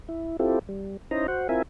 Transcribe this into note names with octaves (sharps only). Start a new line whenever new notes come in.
E4
C4 E4 F4 G4 A4
G3
C#4 D#4 E4 C5 D#5 A#5
F#4 C5 F#5
C4 E4 F4 A#4 E5 G#5